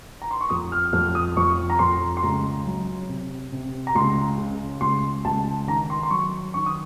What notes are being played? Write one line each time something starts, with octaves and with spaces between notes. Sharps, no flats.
A#5
C6
C#6
F2 D#6
F6
F2 F6
D#6
F2 C#6
A#5
F2 C6
C6
C#2 A#5
F#3
C3
C3
A#5
C#2 C6
C#3
C#2 C6
C#2 A5
D#3 A#5
C6
C6
F#3 C#6
D#3 C#6
D#6